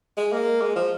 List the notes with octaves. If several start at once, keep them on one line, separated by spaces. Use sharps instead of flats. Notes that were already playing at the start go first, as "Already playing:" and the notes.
G#3
A#3
G#3
F3